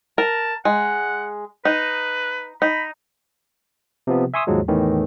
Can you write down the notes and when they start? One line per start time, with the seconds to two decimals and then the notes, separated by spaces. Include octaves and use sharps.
0.18 A#4 A5
0.65 G#3 F#5
1.65 D#4 B4
2.62 D#4 B5
4.07 C3 F3 B3
4.34 E5 G#5 C6 C#6 D#6 E6
4.47 D#2 G#2 F3 F#3 G#3
4.68 E2 A2 D#3 E3